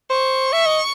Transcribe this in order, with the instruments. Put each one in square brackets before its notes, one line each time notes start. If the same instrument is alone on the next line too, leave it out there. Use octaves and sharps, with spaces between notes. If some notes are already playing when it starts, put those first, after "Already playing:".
[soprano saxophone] C5 [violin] C#6
[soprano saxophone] E5
D#5